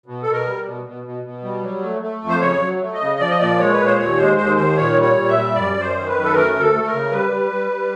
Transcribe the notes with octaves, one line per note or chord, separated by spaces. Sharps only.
B2
B2 A4
A#4
G3
B2
B2
B2
B2
G3
F#3
A3
A3
F2
C5
C#3 C#5
F#3
A3
D#5
C#3
F3 D5
D#5
A#2 D5
G#3 C#5
A#2 B4
C5
D#2 C#5
G#3 C5
D#2 C5
D#3 C5
A#2 C#5
G3
C#5
A#2
E5
G3
F#2 D5
F#2
C5
D#3
B4
F#2
A4
A3 A#4
D2
A4
A3
A#4
C#3
G3 B4
G3
G3
G3